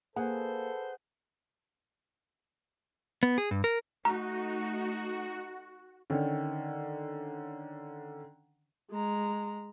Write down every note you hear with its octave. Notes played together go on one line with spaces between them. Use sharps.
A#3 G#4 A4 B4 C5 F#5
B3
G#4
G2
A#4
A3 D#4 F#4 A#5
D3 D#3 C#4
G#3 A#5